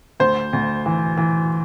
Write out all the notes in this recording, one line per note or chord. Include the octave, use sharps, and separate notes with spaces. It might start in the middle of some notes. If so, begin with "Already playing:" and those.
D2 C5
D2
E3
E3